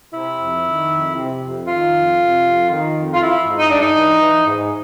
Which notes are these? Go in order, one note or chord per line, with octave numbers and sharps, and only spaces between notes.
C3 E4
F2
D#3
F2
C3
F2
D#3 F4
F2
C3
F2
D#3
F2
F4
E3 E4
G#2
D#4
G#2 D4
D#4
E3
E3
G#2